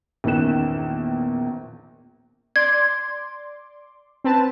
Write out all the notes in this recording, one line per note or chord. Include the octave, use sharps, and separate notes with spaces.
A#1 E2 D#3 C#4 F#6 E7
D5 C6 D6 G#6
C4 B4 A5